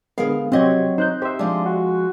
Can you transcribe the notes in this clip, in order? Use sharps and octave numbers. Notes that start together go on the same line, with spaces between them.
D3 G#3 B3 G#4 A#4 F5
C3 F#3 C4 F#4 G4 D#5 G#6
D#4 C5 F#6 G6
G4 C5 E5
F3 G#3 D4
F#4